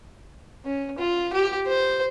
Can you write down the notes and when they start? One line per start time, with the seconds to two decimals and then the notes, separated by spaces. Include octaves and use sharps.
0.65 C#4
0.99 F4
1.33 G4
1.67 C5